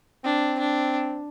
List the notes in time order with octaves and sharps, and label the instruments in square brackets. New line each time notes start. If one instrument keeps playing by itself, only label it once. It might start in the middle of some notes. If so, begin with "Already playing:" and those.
[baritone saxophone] C4 [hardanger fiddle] D4
[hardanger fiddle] D4